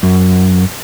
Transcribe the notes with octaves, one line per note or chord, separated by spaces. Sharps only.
F#2